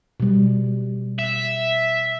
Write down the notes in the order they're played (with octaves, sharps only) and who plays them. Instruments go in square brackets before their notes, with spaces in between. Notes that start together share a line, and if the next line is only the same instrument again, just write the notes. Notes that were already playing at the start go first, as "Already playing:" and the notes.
[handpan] B2 G3
[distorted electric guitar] E5